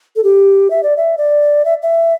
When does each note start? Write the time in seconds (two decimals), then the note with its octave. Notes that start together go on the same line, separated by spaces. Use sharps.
0.16 A4
0.24 G4
0.70 E5
0.83 D5
0.97 E5
1.18 D5
1.65 E5
1.83 E5